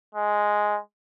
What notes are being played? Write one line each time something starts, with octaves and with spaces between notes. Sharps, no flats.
G#3